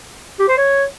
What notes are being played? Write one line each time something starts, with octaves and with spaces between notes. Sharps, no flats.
G4
C5
C#5